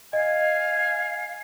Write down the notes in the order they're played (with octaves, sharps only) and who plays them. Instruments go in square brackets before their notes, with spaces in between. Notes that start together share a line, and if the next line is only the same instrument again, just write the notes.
[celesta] D#5 [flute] F5 [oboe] G#5